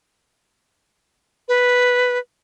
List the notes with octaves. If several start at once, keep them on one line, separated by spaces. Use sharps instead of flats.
B4